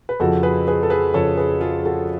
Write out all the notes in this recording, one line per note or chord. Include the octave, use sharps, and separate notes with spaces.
B4
F2 C#3 F3 F#4 A4
G#4 B4
G#4 B4
A4
G#4 B4
F2 C#3 F3 A4 C#5
G#4 B4
F4 G#4
F#4 A4